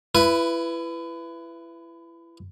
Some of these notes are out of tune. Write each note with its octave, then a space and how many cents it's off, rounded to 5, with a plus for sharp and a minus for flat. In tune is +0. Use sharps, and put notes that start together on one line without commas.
E4 +30 B4 +5